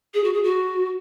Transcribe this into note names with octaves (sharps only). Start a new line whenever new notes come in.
G#4
F#4
G#4
F#4